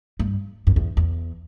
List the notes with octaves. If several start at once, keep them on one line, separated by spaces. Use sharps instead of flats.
G2
F#2
E2
E2